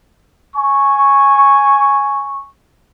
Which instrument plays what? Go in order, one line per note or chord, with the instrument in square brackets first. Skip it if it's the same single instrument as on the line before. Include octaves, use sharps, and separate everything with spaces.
[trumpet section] G#5 C#6